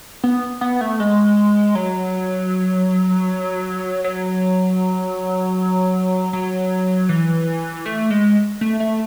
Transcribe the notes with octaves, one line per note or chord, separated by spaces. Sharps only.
B3
B3
A3
G#3
F#3
F#3
F#3
E3
A3
G#3
A3
A3